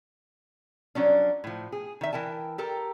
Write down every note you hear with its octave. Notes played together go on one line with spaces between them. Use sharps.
F3 F#3 C#4 D4
A2 F3
G#4
D#3 E5
E3 A#4 G5 A5
G4 A4 A#4